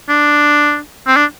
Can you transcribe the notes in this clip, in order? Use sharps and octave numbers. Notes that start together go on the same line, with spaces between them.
D4
C4
D4